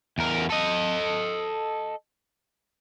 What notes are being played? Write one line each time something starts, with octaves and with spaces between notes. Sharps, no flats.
E2 A#4
A4 D#5